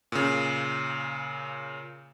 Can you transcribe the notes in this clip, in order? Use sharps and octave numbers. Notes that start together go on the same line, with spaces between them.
A#2 C#3